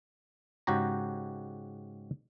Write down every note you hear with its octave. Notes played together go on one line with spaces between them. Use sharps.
G#2 C#3 F#4 G4 A#5